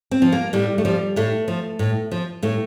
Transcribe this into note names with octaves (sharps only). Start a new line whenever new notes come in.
C4
F3
A#3
A2 G3
A3
F3 G3
A2 A3
F3
A2
F3
A2 A3